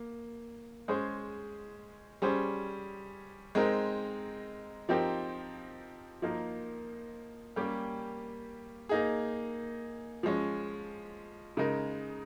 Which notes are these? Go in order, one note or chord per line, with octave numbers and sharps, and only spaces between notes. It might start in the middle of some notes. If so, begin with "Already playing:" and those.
Already playing: A#3
G#3 C#4 G#4 C5
G3 C#4 G#4 C5
G#3 C4 D#4 A#4
F3 C4 D#4 G4 A#4
F3 A#3 D#4 A#4
G3 A#3 C#4 G4
A#3 D#4 G#4
F3 G#3 C#4
C#3 G#3 D#4 A#4